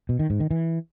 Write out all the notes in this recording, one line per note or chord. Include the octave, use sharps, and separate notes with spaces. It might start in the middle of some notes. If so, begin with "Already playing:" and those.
B2
D#3
G#2
D#3
E3